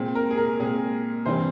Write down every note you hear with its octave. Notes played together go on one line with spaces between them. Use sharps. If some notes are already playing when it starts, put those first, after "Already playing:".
Already playing: A#2 G#3 C4
A#4
G#4
A#4
A#2 G#3 C4 G#4
G2 E3 G3 C4 C5